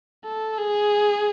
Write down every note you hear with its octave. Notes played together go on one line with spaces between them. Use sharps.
A4
G#4